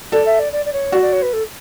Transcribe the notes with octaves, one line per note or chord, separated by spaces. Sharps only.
A4 D5
E5
D5
D5
D5
C#5
F#4 D5
D5
C#5
B4
A4